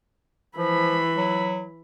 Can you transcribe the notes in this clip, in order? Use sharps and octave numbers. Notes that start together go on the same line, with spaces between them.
E3 F3 B5
F#3